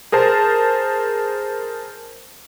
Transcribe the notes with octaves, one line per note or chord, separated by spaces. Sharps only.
G#4 A#4 C5 A5